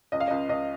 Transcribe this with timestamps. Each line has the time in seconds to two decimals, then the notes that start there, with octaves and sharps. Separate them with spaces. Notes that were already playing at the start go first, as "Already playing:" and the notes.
0.12 C#2 D#5
0.20 F5
0.28 D#5
0.30 C#2
0.49 C#2 D#5